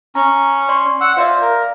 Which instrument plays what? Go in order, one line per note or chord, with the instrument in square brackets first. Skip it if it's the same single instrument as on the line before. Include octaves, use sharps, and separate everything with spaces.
[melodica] C#4 [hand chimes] A#5
[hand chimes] D5 C6 C#6
[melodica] F#5 E6
[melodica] F4 C5 [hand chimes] D5 E5 F5
[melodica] A#4